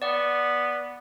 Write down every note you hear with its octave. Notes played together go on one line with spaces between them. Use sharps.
B3 D5 F#5